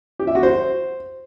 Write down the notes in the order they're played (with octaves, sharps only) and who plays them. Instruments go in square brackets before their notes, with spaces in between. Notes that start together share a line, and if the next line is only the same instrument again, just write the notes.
[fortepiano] G4
E5
F#4
C5